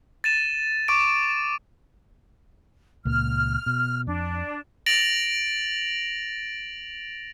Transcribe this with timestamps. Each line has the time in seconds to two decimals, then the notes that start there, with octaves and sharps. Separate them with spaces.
0.24 A6 D#7 E7
0.88 C#6 D6 D7
3.05 C#2 A#2 A#3 F6
3.66 B2
4.07 F2 D4
4.86 A6 A#6 D7 F7 F#7